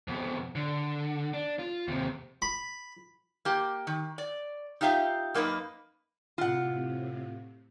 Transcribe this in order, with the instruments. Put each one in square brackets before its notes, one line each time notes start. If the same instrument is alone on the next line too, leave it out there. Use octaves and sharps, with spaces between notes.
[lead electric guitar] F2 B2
D3
D4
F4
D#2 C3
[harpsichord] B5
[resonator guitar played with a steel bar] A#3 G4
D#3
D5
D#4 F4 G4 E5 F5
F#2 A#3 D#4 F4 B4
[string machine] A2 C3 [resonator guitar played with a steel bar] F4 F#5